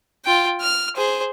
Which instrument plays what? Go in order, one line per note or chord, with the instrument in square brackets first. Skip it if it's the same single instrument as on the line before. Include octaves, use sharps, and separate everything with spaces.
[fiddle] F4 G5
F6
G#4 C5